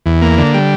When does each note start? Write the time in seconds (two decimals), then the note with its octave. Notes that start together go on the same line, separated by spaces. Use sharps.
0.06 E2
0.22 A#3
0.37 D3
0.54 G3